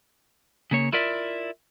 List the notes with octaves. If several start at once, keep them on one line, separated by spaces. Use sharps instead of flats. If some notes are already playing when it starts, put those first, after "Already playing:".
C#3 A#3 C#5
E4 F4 A#4 D5 E5